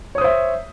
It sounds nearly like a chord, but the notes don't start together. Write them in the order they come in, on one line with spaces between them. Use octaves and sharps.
C#5 D#6 C5 E5